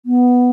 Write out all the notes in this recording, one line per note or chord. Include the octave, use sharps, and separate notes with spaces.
B3